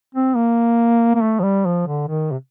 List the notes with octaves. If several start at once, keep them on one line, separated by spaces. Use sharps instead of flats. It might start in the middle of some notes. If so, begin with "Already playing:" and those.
C4
A#3
A#3
A3
F3
G3
F3
D3
D#3
C3